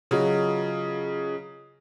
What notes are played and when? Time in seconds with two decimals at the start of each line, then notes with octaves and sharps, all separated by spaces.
0.11 C#3 F#3 F4 G#4 D#5